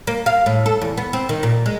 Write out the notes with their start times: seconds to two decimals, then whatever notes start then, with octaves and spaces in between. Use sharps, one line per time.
0.07 A#3
0.26 F5
0.46 A2
0.66 A4
0.81 E2
0.98 B3
1.13 C4
1.29 D#3
1.43 A#2
1.66 G#3